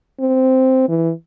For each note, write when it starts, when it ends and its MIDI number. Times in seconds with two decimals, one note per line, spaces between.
0.20 0.86 60
0.89 1.11 52